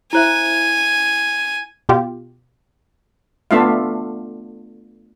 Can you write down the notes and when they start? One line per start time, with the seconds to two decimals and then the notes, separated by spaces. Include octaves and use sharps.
0.13 E4 C5 E5 G#5
1.89 B2 F4 G4
3.51 A3 B3 D4 F4 E5 F5